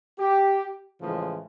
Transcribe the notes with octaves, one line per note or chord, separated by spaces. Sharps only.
G4
A2 C#3 E3 F3 G#3